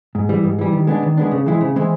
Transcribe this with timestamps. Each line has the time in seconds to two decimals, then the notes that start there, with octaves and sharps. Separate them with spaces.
0.15 G#2
0.29 E3 G3
0.44 G#2
0.58 E3 G3
0.73 D#3
0.87 G#3 B3 D4
1.03 D#3
1.17 G#3 B3 D4
1.31 C#3
1.46 E3 G#3 C4 E4
1.61 C#3
1.76 E3 G#3 C4 E4